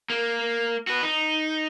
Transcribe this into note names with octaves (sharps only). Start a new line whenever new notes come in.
A#3
F#4 B4
D#4